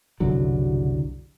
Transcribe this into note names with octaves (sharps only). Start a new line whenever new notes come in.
F#1 C2 D3 F#3